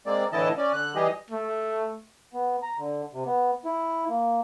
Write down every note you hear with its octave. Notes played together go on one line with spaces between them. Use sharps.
G#3 A#3 C4 D5
A2 D3 E3 E4 D#5 A5
C#4 D5
D3 F#6
E3 G3 G4 G#4 D#5
A3
B3
A#5
D3
C3
B3
E4
A#3